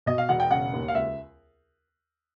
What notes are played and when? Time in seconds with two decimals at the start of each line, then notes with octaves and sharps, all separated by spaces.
0.06 B2 D#5
0.18 F5
0.29 E1 F#5
0.40 G5
0.51 C#3 F#5
0.73 D#2
0.88 F5
0.95 C#2 E5